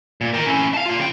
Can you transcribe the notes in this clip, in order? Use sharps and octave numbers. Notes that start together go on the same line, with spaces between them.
A#2
A#4 G5
C#4 E4
F5 A5
A#2 F4
C#3 G5